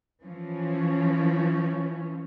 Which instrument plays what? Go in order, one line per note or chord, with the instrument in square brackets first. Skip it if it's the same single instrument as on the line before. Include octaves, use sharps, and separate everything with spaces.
[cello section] E3 F3 C#4